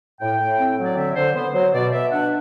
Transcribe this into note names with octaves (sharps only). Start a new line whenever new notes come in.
A2 G5
A2
C4
F#3
D5
D3 E5
D3 C5
B3 C5
F#3 C5
B2 D5
B2 E5
D4 F#5